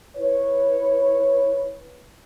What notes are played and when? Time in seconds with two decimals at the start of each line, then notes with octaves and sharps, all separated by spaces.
0.16 E4 B4 C#5